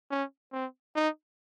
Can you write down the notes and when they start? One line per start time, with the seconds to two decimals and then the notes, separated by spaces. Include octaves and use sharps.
0.11 C#4
0.53 C4
0.96 D#4